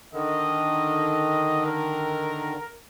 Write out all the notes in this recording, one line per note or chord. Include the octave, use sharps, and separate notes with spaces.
D3 D#3 D#5
A#4